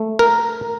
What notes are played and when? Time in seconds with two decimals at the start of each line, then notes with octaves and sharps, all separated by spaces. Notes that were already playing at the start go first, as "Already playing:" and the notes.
Already playing: A3
0.19 A#4